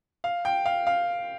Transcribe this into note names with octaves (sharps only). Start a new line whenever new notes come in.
F5
G5
F5
F5